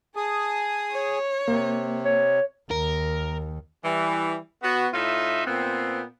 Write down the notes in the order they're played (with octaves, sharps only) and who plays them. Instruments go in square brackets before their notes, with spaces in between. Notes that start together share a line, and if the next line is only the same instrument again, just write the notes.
[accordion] G#4 D#6 [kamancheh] G#5 A5
[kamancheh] C#5
[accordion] C3 [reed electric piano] A#3
[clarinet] C#5
[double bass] D#2 [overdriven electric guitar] A#4
[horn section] E3 G3
B3 F#4
A2 D#4 F4 E5
A#2 B3 C4